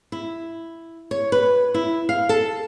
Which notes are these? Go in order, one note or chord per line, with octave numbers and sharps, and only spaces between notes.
E4
C#5
B4
E4
F5
A4